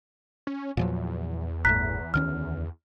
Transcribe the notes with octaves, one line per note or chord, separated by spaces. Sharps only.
C#4
E2 A#2 F3 F#3
G1 A2 A3 A#5 F#6 B6
D2 D#3 C#4 F6